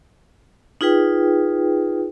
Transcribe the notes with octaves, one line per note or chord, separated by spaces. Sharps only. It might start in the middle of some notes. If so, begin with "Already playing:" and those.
D#4 F4 G#4 B4 G5